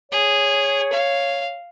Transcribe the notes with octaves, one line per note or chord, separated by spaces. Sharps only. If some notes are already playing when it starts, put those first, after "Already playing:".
G#4 C#5
F5